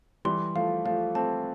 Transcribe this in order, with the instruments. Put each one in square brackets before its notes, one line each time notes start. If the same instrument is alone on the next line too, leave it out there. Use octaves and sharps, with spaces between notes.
[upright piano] E3 G3 [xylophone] C6
[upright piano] F3 A3 [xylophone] F5
[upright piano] F3 A3 [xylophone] F5
[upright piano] A3 C4 [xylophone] A5